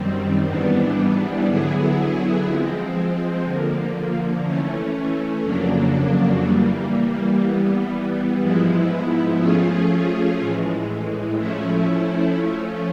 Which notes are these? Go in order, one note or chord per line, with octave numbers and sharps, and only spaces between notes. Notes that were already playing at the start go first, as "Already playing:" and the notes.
Already playing: F#2 D#3 G3 C4
G#2 E3 G3 B3 D4
D3 F#3 B3 E4 G#4
F3 G#3 C4
D3 F3 A#3
E3 A3 C#4
F2 C#3 F#3 A#3 D4
E3 G3 A#3
E3 G3 B3
G#2 F3 G#3 B3 E4
F3 A3 C#4 F4 G#4
A2 E3 G#3
F3 A3 C#4 E4
F3 A3 C#4